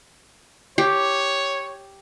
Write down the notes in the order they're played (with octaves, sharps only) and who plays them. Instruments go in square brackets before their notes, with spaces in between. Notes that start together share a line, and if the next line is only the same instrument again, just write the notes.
[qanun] G4 [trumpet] C#5